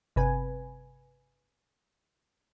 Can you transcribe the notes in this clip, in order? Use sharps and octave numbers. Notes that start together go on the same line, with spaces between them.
G1 C3 B4 G#5